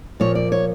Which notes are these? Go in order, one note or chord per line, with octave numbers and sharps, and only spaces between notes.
A#2 F3 A#3 C#5
D5
C#5